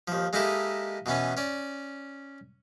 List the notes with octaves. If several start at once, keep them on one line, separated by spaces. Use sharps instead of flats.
D#2 F3
G#3 A#3 D#4 E4 G4 A4
B2 E3 B3 C#4
C#4 D5